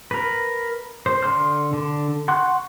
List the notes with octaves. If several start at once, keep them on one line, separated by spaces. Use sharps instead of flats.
A#4 B4
C5
D3 C6 F6
D3
F#5 C6 C#6 F#6